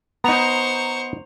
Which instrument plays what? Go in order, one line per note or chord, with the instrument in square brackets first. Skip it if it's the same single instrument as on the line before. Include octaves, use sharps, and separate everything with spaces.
[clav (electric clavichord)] B3 D#4 [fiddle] C5 C#6 [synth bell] A#5 F7